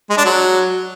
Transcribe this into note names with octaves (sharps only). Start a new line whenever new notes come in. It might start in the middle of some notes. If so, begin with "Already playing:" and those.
G#3
D4
F#3